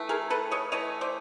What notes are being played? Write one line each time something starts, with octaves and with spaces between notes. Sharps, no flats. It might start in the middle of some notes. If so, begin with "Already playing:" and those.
Already playing: E3 A3
G#4 A#4
A4 B4
C#5 D#5
E3 A3 C#5 D#5
C5 D5